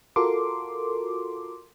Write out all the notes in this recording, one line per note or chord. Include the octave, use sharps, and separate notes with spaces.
F4 F#4 A4 A#4 C6 D6